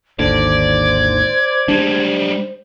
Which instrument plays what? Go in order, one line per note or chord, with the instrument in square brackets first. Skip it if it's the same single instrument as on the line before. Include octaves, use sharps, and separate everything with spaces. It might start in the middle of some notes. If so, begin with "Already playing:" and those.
[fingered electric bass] G#1 D#2 D3 [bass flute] C5 [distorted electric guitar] D5 [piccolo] G#6
[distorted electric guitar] G3 G#3 [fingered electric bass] D4